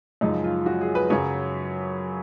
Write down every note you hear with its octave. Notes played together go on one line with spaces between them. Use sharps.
F#2 C#3 F3 G#3 D#4
F4
F#4
G#4
B4
F#2 C#3 F#3 C#5